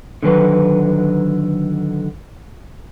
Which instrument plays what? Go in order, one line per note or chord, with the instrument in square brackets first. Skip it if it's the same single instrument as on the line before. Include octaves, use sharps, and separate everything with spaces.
[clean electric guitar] D3 D#3 F#3 B4